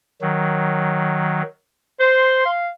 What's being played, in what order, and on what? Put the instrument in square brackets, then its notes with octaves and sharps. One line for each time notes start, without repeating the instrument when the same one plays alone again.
[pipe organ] D#3 F#3
[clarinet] C5 [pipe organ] C6
[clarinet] F5